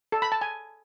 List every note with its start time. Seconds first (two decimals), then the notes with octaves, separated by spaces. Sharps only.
0.12 A4
0.22 B5
0.32 A5
0.41 G#5